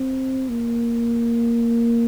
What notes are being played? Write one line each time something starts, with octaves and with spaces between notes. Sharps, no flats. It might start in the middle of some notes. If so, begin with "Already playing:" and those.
Already playing: C4
A#3